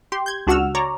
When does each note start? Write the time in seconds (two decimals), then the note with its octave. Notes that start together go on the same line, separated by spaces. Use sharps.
0.12 G4 C6
0.26 G6 G#6
0.47 C#2 D4 F#4 F#5 E6 F6
0.75 C#5 D5 A#5